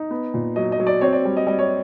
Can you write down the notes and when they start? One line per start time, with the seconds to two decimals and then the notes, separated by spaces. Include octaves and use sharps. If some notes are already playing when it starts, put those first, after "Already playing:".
Already playing: D#4
0.11 B3
0.34 A#2
0.56 F#3 D#5
0.72 D#5
0.80 F#3
0.87 D5
1.01 C4 C#5
1.13 D5
1.25 G3
1.37 D#5
1.47 G3 D#5
1.59 C#5